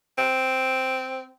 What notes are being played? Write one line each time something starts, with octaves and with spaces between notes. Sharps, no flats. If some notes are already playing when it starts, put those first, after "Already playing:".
C4